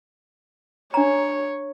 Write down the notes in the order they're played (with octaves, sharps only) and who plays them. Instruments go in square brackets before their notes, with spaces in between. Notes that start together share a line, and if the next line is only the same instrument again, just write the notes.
[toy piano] D4 A#5 [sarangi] C#5